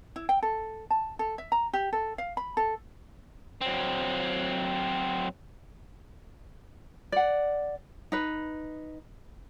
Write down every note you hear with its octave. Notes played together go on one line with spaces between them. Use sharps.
E4
G5
A4
A5
A4
E5
A#5
G4
A4
F5
B5
A4
F#3 C4
D5 F#5
D#4 B4